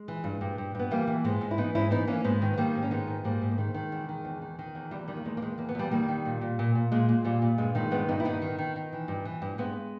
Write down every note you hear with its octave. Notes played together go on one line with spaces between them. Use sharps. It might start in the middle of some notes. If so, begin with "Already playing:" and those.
Already playing: G#3
E3
G2
G2
G2
G2 B3
E3 G3 A#3
E3
G#2 G#3 B3
G#2
E4
E3 B3 D#4
G#2 C#4 E4
E3 B3 D#4
E3 A#3 C#4
C#4
G#2 G#3 B3
D#3
B3
D#3 G3 A#3
G#2
C#4
D#3 G#3 B3
G#2
G#2 G3 A#3
G#2
A#3
D#3 G#3
D#3
E2
D#3
E2
D#3
D#3
E2
E2 G3
D#3 G3
A#3
E2 G#3
A#3
D#3 G#3
E2 A#3
B3
E2 G3 A#3
D#3 G3 A#3
D#3
A#2
A#2
A#2
A#2
A#2 G#3
A#2
A#2 G3
A#2
G2 G#3
D#3 G#3
G2 G#3 B3
G2 B3 D#4
E4
D#3 B3 D#4
D#3
D#3
D#3
E3
G2
E3
G2
G2 G#3 B3